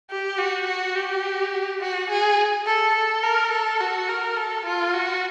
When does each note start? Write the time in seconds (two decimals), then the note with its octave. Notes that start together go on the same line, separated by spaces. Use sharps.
0.10 G4
0.38 F#4
0.67 F#4
0.96 G4
1.81 F#4
2.10 G#4
2.66 A4
2.95 A4
3.23 A#4
3.52 A4
3.81 F#4
4.09 A#4
4.37 A4
4.66 F4
4.94 F#4